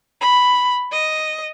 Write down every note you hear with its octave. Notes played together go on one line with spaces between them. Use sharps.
B5
D#5